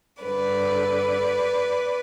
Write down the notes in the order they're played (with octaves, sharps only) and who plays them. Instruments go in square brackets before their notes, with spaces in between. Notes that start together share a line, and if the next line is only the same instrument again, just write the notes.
[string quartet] G2 D3 B4 D5